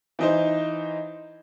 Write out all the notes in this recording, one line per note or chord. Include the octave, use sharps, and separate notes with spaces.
E3 D#4 C5